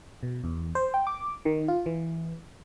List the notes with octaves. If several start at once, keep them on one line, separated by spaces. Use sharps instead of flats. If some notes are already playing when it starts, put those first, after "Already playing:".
B2
E2
C5
G5
D6
D#3
F4
E3